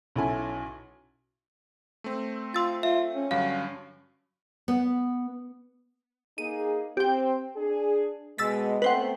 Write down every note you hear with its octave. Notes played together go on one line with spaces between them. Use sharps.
B1 C#4 E4 A4 G#5
A3 C4
F4 C6 E6 A6
F4 E5
C#4
G2 D3 F#3 F5
B3
A#3 D#4 G#4 D#7
C4 G4 G5
D4 G#4
B2 G#3 E6 A6 B6
A3 B3 C4 B4 C5 F#5